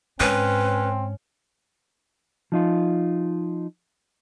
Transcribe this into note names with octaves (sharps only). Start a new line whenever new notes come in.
G#2 C4 C#4 B4
F3 D#4 F4